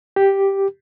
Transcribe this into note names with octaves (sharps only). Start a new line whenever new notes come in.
G4